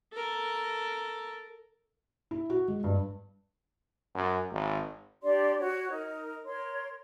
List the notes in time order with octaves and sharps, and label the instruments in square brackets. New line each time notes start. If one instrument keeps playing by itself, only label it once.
[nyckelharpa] A4 A#4
[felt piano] E4
F#4
G#3
G2
[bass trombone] F#2
G#1
[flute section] D4 G4 D5 C6
F#4 C#5
D#4 A#4
A#4 C#5 C6